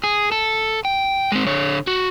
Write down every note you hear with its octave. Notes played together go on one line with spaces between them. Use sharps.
G#4
A4
G5
G#3 C4
D3 C#5
F#4